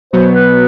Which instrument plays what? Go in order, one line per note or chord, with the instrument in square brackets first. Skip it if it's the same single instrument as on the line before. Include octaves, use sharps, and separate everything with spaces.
[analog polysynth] B2 F#3 B3 [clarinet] C5
[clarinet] B4